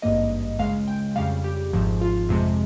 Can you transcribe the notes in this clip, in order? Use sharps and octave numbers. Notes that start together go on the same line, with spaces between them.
G#1 G2 G3 A#3 D#5
C#2 C#3 G#3 F5
G5
F2 C#3 G3 F5
G4
G#1 G#2 F3
F4
F2 C3 F3 G#3